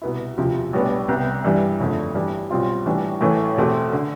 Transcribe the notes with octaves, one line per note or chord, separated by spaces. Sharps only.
C2 B2 B3 E4
E1 D2 C3 F3
B1 A2 G3 B3 D4
C2 C3 G3 B3
G2 E3 G3
G1 F2 D3 A3
G2 E3 G3 D4
B1 B2 G3 C4 F4
A2 E3 G3 D4
A1 A2 E3 A3
E2 B2 A3 C4 G4
D3